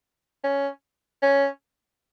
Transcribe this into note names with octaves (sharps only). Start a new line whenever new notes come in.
C#4
C#4